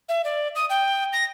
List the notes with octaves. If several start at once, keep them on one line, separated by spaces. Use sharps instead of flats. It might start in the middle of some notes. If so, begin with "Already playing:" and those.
E5
D5
D#6
G5
A#6